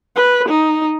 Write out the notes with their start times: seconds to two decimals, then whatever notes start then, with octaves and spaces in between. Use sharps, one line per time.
0.16 B4
0.49 D#4